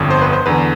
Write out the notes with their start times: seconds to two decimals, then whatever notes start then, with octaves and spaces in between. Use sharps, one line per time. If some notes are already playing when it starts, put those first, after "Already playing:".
Already playing: G1 F2 D3
0.10 C5
0.21 B4
0.33 C5
0.46 E2 D3 B4